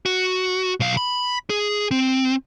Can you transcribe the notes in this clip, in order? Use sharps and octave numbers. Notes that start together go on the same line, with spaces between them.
F#4
B1 F5
B5
G#4
C4